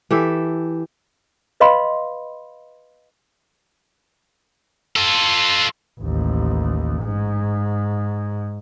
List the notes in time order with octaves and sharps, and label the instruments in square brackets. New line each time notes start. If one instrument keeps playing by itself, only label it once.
[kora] E3 G4 A4 E5
[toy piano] B4 D#5 F5 B5 C6
[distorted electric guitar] F4 A4
[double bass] A1 D#2
G#2